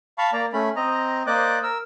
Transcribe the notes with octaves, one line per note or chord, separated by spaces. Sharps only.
F5 A5 B5 C#6
A#3 D5 A#5
A3 C#4 B5
C4 D#5 A#5
A#3 C5 D5 D#5 D6 F#6
A#4 E6